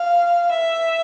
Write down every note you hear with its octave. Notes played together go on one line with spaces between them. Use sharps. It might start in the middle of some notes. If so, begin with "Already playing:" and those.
Already playing: F5
E5